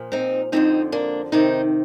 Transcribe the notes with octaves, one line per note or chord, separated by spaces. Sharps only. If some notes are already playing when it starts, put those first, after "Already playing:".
Already playing: A#2 F3
C4 D#4
F2 D3 F3 C4 D#4
A#3 D4
F2 C3 D#3 C4 D#4